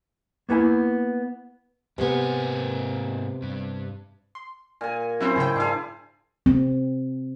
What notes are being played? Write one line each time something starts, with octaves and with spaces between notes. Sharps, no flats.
A#3 B3 E4 G#5
G#2 C3 A#3 B3 G#5
G2
C6
A#2 G#5
F#3 C4 C#4 E4 C5
G#2 C#3 G#4 G5
G#2 D4 E4 G#4 F5
C4